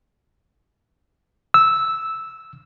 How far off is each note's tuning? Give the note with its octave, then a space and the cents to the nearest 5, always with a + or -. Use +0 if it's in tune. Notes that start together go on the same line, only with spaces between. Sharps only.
E6 -10